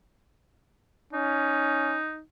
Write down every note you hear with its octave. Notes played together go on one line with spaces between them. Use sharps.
C#4 D#4